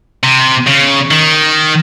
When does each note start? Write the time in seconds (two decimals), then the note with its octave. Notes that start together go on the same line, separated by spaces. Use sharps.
0.23 C3
0.67 C#3
1.11 D#3